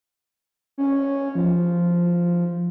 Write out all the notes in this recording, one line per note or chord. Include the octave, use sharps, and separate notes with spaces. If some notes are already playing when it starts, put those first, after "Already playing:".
C#4
F3